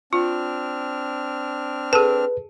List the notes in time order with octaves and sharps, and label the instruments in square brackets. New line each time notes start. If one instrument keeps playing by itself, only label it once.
[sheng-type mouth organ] C4 D4 F6 [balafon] F4
[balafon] G#4 A4 A5 [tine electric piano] B4